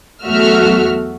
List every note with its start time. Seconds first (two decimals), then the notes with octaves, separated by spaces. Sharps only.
0.23 E2 F#3 A3 F#4 E5 F6